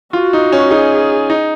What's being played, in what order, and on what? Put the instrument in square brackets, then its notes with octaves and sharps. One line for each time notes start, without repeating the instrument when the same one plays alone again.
[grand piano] F4 [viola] F#4
[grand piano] D#4
C#4
[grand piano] D#4 [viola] G#4
[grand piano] D#4